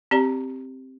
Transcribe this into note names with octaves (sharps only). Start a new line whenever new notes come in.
C4 G4 D5 A#5